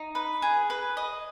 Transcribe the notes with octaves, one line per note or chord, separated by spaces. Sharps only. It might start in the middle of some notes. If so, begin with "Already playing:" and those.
Already playing: D#4
B4
G#4
B4
D#5